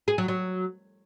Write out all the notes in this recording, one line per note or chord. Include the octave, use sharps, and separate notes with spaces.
G#4
F#3
F#3